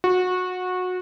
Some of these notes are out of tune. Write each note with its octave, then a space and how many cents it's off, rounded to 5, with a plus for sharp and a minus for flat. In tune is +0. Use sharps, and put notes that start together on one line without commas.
F#4 -20